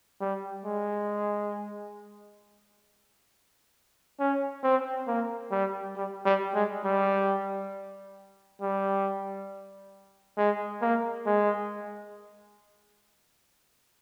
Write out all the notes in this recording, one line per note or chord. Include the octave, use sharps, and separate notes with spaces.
G3
G#3
C#4
C4
A#3
G3
G3
G3
G#3
G3
G3
G#3
A#3
G#3